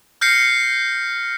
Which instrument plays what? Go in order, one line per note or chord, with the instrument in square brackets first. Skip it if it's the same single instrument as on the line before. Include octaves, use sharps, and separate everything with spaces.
[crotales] F6 G6 A#6 C7 C#7